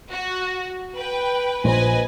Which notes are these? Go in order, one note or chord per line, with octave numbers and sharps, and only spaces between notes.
F#4
B4 G5
A#1 B4 C5 D#5 G#5